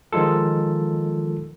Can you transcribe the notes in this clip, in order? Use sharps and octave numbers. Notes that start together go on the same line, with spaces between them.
D#3 F3 G#3 F4 A4